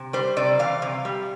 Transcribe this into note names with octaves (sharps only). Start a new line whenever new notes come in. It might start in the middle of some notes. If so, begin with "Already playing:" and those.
Already playing: C3
G3 C5
C3 D5
E3 F5
C3
G3